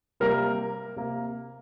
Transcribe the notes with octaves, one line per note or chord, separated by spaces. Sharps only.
C3 G3 A#3 A#4
C3 A#3